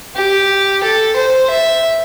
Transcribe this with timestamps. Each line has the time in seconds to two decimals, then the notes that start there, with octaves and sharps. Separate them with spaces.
0.16 G4
0.83 A4
1.16 C5
1.50 E5